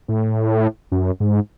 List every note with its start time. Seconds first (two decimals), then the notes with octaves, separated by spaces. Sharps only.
0.08 A2
0.92 F#2
1.20 G#2